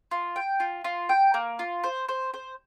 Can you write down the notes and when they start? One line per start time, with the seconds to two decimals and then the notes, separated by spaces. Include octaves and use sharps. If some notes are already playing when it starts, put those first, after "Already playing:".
0.11 F4
0.36 G5
0.60 F4
0.84 F4
1.09 G5
1.34 A#3
1.59 F4
1.84 C5
2.09 C5
2.34 C5